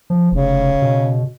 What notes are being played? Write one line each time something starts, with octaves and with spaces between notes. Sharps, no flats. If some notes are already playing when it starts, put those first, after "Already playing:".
F3
F1 C#3
B2